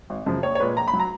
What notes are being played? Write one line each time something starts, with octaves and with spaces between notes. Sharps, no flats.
G#1
F#2 C#3 F3
A#1 C#5
C#5
A#2 G#3 B4
A#1 A#5
B5
F#3
A#5